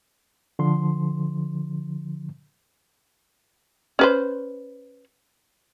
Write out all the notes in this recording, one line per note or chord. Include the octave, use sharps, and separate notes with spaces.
D3 F3 C6
C#4 B4 C5